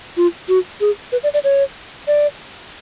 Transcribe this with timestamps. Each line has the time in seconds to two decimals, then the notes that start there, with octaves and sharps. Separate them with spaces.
0.17 F4
0.49 F#4
0.81 G#4
1.12 B4
1.23 D5
1.34 D5
1.44 C#5
2.08 D5